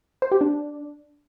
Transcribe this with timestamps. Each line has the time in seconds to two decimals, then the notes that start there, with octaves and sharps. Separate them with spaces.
0.22 C5
0.31 G4
0.41 D4